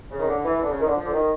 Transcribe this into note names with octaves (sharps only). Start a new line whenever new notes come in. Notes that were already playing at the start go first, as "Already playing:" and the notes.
C#3
D#3
D3
E3
D3
C#3
D#3
D3
F3
D3
D#3